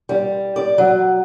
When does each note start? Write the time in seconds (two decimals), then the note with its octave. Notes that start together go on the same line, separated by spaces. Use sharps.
0.09 G3
0.56 D5
0.78 F#3